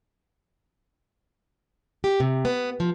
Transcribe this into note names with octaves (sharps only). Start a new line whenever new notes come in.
G4
C3
B3
F3